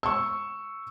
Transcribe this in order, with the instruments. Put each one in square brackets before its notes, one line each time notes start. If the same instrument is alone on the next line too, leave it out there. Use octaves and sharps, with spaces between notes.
[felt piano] C#6 E6